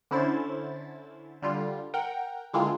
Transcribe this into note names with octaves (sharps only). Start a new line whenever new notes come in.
D3 C#4 E4 C5 A6
D3 G3 F4
A#4 F#5 G5
D3 G#3 A#3 C4 E4 F4